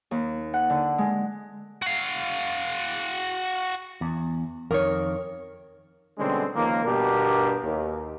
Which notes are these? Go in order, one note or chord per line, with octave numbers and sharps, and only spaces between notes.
D#2
F#5
D3
G#3
F#4 F5
E2
F2 D#3 A#4 C#5
B2 D3 G3 G#3 C4 C#4
C#2 D#3 F3 A#3
G2 B2 B3 D4 G4 A#4
D#2